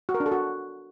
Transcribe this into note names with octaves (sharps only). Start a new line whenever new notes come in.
F#4
A#4
D4
A4
F#4